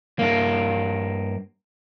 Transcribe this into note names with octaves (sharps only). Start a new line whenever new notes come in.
G2 A#3